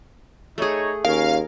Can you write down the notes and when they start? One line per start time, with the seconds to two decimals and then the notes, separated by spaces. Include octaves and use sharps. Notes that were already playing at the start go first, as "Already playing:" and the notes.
0.58 A3 D#4 G#4 C#5
1.05 D#2 C#4 A#4 F5